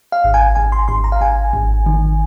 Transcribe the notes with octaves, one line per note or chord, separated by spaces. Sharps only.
F5
G#1
G#5
G#1 G#5
C6
G#1 C6
A#5
F5
G#1 G#5
G#1
D#3